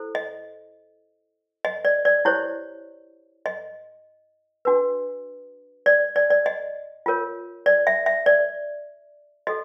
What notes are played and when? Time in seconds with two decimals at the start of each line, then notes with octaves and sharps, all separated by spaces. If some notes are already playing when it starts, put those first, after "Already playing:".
Already playing: E4 A4 C5
0.15 D#5
1.65 D#5
1.85 D5
2.05 D5
2.25 E4 G4 C5 C#5
3.46 D#5
4.65 D4 F#4 B4
5.86 D5
6.16 D5
6.30 D5
6.46 D#5
7.06 F4 A#4 C#5
7.66 D5
7.87 E5
8.06 E5
8.26 D5
9.47 F#4 A4 D#5